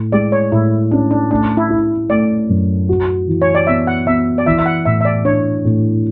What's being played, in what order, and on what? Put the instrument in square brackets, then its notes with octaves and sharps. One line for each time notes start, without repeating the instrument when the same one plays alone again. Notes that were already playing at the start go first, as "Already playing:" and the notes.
Already playing: [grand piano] A2
[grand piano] G#3 [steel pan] D5
[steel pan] C#5
[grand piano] A2 [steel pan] E4
[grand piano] C#4 [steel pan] D4
[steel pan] D4
[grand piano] A3 [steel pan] D4
[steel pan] E4
[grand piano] E4
[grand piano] A3 [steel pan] D5
[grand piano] F#2
F#4
E3
[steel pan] C#5
D5
[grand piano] B3 [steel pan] E5
[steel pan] F#5
[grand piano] B3 [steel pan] E5
[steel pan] D5
[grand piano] E3 [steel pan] E5
[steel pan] E5
F#5
[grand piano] A2 [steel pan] E5
[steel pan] E5
D5
[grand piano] D4 [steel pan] C#5
[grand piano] A2